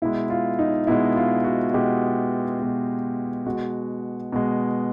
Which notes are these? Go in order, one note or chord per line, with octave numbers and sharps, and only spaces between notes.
B2 G#3 E4
F4
D#4
B2 G#3 E4
F4
F#4
B2 G#3 G4
B2 G#3
B2 G#3 F#4
B2 G#3